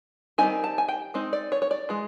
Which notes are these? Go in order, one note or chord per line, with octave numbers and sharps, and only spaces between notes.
D#3 G3 C4 D#4 G#5
A5
G#5
G5
G#3 C4 D#4
D5
C#5
C#5
D5
E3 G#3